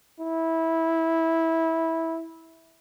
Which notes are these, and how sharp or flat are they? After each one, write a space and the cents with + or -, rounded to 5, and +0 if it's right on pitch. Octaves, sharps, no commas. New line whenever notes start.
E4 -15